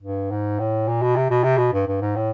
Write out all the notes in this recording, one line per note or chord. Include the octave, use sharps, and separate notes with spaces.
G2
G#2
A2
A#2
B2
C3
B2
C3
B2
G2
G2
G#2
A2